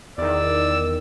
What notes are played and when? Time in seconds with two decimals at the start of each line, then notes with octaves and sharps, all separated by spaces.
0.18 E2 D#3 D5 E6